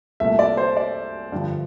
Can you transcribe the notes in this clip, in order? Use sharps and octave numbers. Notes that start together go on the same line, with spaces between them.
C2 A#2 A3 E5
D5
C5
D5
G2 D3 F3